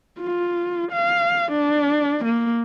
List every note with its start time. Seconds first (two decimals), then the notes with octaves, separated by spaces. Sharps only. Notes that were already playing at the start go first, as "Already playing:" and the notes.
0.20 F4
0.92 F5
1.52 D4
2.25 A#3